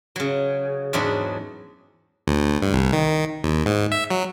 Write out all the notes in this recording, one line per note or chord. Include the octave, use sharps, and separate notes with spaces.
C#3 F#3
E2 G#2 F#3 D4 F#4 B5
D2
G2
C2
D#3
D#2
G#2
E5
F#3